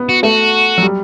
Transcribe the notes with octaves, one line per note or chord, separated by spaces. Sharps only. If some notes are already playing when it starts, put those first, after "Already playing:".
Already playing: B3
F#4
A3 F#4
F#3
G3